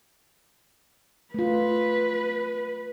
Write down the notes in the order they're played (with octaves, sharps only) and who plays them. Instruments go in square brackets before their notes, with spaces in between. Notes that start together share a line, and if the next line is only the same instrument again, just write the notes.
[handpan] A3 F4 [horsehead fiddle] B4